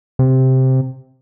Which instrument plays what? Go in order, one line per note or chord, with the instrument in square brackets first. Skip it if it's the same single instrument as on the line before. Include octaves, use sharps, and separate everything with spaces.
[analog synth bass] C3